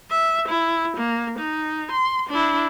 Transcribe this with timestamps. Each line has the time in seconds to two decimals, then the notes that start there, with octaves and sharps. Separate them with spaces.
0.11 E5
0.49 E4
0.97 A#3
1.39 D#4
1.92 C6
2.30 D4 E4